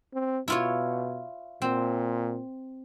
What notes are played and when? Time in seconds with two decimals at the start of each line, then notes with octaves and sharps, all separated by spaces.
0.14 C4
0.48 B2 E4 F4 C#5
1.62 A#2 C4